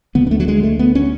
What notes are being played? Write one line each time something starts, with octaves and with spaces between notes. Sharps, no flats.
D2 D3 B3
B3
A3
F#3
G#3
A3
B3
C#4